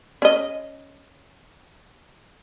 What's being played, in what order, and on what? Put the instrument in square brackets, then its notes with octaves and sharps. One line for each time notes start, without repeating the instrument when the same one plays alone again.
[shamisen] C#4 D#5